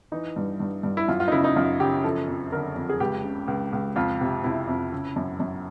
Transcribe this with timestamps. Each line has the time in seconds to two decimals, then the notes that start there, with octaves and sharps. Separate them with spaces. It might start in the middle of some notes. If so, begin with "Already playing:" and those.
0.12 E3 D#4
0.36 G2
0.60 G2
0.83 G2
0.97 E4
1.08 F#2 F4
1.20 F4
1.28 D#4
1.32 C#3 E4
1.44 D#4
1.56 F#2 F4
1.80 C#3 G4
2.04 F3 A4
2.28 F2
2.52 D3 A#4
2.76 F2
2.89 G#4
3.00 C#2 G4
3.24 C#3
3.48 C#2
3.73 C#2
3.96 F2 F4
4.21 C3
4.44 C3 E4
4.68 F2
4.92 C#3
5.16 F#2
5.40 F#2